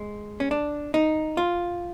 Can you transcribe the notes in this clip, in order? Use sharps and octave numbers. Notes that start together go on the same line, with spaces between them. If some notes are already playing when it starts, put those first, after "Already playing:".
Already playing: G#3
C#4
D4
D#4
F4